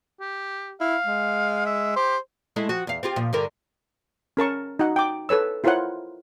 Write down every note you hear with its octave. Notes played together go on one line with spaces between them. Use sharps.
G4
E4 F5
G#3
E5
G4 C5
G#3 A3 E4
F3 F#3 F#4
E2 F5
C4 F4 G4
A#2 F3
G2 D3 A#4
C#4 A#4 A5 C#6
D#4 F#4 F#5
G5 D6
A4 B4 C#5 E6
E4 F4 A#4 C5 C#5 F#5